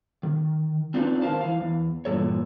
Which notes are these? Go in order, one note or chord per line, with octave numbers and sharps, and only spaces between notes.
D#3
C4 D4 D#4 F4 F#4 B4
D#3 B3 A#4 C5 F5 A5
E3 F5
E2
E2 G2 A#2 E3 A4 C#5